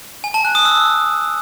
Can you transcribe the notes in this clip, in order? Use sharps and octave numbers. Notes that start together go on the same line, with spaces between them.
G#5
A5
F#6
D#6
E6